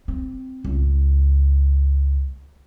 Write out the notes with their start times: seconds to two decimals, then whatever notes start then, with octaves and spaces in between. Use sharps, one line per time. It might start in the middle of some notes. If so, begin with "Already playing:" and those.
0.08 C4
0.64 C#2